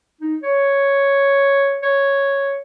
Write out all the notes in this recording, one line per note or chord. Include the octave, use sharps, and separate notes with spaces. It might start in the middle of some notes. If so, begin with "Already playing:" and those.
D#4
C#5
C#5